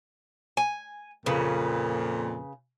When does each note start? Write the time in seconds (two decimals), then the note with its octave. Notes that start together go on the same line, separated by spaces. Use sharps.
0.57 G#5
1.26 F2 A#2 C#3 B4